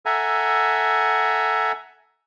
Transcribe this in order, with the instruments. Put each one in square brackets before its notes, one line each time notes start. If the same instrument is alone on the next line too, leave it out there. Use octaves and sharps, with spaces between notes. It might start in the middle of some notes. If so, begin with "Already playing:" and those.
[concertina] A4 E5 F#5 G#5 A#5